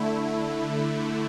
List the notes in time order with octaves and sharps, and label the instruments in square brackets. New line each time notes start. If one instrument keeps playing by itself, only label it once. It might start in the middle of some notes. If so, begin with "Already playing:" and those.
Already playing: [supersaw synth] D3 A3 E4